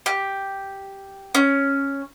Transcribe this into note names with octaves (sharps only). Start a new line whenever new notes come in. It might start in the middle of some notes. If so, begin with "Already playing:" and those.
G4
C#4